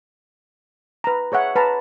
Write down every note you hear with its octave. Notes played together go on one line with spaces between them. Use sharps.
B4 A#5
G#4 C#5 E5 F#5
B4 A5 A#5